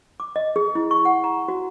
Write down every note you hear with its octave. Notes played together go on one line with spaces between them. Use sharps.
D6
D#5
G#4
E4
C#6
F#5
A#5
F#4